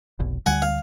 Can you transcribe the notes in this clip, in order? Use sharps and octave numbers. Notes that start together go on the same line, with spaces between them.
F1 B1
D2 D3 G3 F#5 G#5
F5